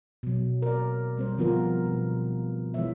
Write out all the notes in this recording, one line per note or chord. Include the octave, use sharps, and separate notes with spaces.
B2 F#3
A#4 D5
G3 C4 C5
D3 F3 B3 F4 A#4
B2
E3 G#3 B3 C5 C#5 E5